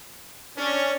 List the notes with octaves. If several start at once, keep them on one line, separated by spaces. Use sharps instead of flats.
C#4 D4